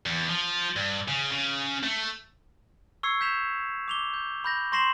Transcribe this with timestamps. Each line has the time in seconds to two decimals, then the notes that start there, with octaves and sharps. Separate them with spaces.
0.06 E2
0.29 F3
0.76 G2
1.08 C#3
1.32 C#3
1.83 A3
3.03 C#6 E6 G#6 C7 C#7
3.21 G6 B6 E7 F7
3.88 D6 F7 G7
4.14 G6
4.44 B5 G6 A#6
4.72 C6 C#6 A#6 C7 E7 F#7